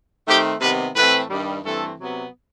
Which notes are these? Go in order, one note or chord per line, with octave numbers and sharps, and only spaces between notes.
D#3 A3 C4 G4
C3 D#3 G3 B3 B4
A2 E3 A3 C4 B4
G2 D#3 G3
G2 E3 A3 C4 A4
C3 F#3 B3